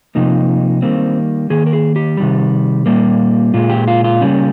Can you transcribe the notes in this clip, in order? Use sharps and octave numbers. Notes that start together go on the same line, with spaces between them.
C3 F3 A#3 D#4
D#3 G3 A#3 C4
D#3 A#3 G#4
A#4
G#4
G4
C3 D#3 G3
A#2 G3 A#3
A#2 G#3 F4
G4
F4
F4
C#3 G3 A#3 C#4